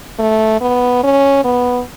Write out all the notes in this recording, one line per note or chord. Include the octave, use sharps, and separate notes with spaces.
A3
B3
C#4
B3